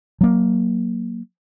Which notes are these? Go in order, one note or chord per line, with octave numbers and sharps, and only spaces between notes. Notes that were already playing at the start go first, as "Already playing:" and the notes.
F#3 A#3